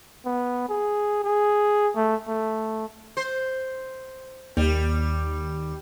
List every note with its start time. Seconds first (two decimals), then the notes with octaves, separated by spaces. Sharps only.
0.26 B3
0.69 G#4
1.24 G#4
1.96 A3
2.28 A3
3.17 C5
4.57 D#2 G3